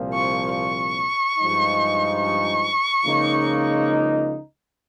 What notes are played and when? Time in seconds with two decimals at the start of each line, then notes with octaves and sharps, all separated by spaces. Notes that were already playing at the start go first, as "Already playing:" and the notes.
Already playing: C2 A#2 F3
0.14 C#6
0.55 C#6
1.39 G2 F3 G#3 D#4
2.22 C#6
3.05 C#2 C#3 F3 A#3 D#4